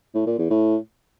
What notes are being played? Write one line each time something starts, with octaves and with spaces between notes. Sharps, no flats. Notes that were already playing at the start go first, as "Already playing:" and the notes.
A2
A#2
E2
A2